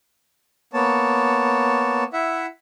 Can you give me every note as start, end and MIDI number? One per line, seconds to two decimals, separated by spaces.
0.73 2.04 58
0.73 2.04 59
0.73 2.04 73
0.73 2.04 81
2.13 2.46 64
2.13 2.46 76
2.13 2.46 78